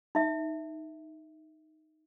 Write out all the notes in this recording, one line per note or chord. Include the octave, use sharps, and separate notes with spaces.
D#4 E5